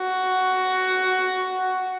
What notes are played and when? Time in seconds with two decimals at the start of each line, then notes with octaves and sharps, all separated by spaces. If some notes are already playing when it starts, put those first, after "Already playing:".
Already playing: F#4